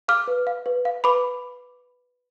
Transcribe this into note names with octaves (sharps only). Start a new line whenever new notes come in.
F5 D6 F6
B4
F5
B4
F5
B4 B5 D6